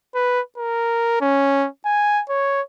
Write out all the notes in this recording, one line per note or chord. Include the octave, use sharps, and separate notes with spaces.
B4
A#4
C#4
G#5
C#5